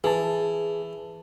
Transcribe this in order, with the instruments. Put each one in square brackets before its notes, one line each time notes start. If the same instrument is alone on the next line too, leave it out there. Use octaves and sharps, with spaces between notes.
[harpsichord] E3 [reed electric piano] G#4 A5